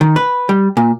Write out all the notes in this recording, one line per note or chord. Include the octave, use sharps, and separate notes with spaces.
D#3
B4
G3
A#2